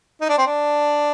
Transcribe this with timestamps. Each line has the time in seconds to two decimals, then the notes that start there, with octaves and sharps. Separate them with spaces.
0.21 D#4
0.29 D4
0.38 C4
0.46 D4